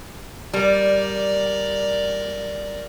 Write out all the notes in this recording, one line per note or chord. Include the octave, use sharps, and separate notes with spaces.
G3 A#4 D5